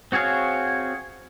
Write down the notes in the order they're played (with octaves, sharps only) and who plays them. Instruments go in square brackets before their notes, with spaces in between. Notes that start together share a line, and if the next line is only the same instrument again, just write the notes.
[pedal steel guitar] C4 F#4 G#4 C#5 F5